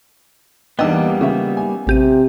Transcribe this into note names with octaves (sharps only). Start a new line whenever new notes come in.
E2 G3 A#3 B3 D4 D#5 G5 E6
C#3 E5
G#5
A1 C3 G4 D#7